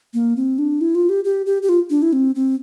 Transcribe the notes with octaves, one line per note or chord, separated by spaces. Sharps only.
A#3
C4
D4
E4
F4
G4
G4
G4
G4
F4
D4
E4
C4
C4